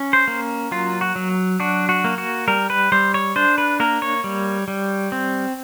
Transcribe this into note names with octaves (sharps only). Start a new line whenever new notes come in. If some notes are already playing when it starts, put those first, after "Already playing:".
Already playing: C#4
C5
A#3
F#3 F4
F#4
F#3
D4 F#4
F#4
A#3
F#4
G3 A#4
B4
G3 C5
C#5
D4 C5
B4
A#3 A#4
C#5
G3
G3
C4